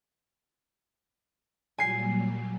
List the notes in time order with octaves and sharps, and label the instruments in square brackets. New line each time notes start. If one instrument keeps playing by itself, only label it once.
[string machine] A#2 F#3 G3 [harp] G#5 C7